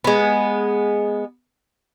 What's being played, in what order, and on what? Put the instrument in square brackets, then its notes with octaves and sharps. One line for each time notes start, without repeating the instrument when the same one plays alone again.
[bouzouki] G#3 B3